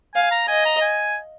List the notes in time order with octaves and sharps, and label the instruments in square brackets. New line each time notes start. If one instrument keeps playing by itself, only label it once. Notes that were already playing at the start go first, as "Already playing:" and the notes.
[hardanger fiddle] F5 [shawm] G#5
[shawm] A#5
[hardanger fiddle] D#5 [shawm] G#5
[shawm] A#5
G#5